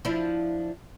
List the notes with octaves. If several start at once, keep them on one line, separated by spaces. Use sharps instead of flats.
F3 D4 E4